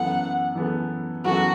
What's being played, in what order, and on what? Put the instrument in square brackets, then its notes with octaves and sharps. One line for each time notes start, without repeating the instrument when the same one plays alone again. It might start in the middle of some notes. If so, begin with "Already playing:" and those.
Already playing: [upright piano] F#2 E3 B3 A4 [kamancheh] F#5
[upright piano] F#2 E3 B3 A4
[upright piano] F#2 E3 B3 A4 [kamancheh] F#4